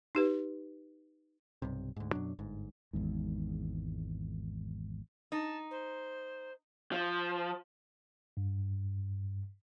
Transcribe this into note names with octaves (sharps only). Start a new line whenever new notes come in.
D#4 G4 B4
B1 G2 C3
D2 G#2
F#2 B2 F#3 D4
G1 G#2
G#1 E2 G#2
D#4 A5
C5
F3
G2